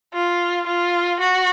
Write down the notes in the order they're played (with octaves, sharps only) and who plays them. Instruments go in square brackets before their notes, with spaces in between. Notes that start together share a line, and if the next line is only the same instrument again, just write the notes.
[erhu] F4
F4
F#4